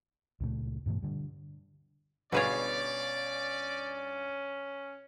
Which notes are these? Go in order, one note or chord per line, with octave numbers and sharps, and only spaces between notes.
C#2 A#2 G#3 A3
G2 B2 E3 A3
D3 G3
G1 B2 C#4 G#4 B4 C#5 D5 F5